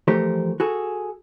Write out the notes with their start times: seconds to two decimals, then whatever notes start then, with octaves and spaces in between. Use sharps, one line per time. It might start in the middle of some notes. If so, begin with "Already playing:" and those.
0.08 E3 F3 A3 G4 A#4 C5
0.60 F#4 G#4 A4